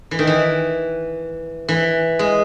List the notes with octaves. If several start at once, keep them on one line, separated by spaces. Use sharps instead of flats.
E3
D#3
E3
E3
G#3